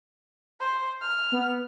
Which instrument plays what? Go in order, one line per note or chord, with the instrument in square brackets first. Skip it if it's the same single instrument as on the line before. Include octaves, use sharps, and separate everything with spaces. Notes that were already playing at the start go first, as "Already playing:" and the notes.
[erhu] C5
F6
[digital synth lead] B3